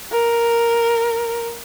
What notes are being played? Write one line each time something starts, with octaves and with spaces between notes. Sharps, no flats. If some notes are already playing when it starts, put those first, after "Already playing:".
A#4